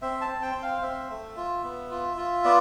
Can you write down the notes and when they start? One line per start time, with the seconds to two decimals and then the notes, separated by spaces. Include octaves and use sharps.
0.02 C4 E5
0.21 A5
0.29 C4
0.42 G5
0.56 C4
0.62 F5
0.82 C4 E5
1.10 A3
1.36 F4
1.64 B3
1.91 F4
2.17 F4
2.44 B3 D5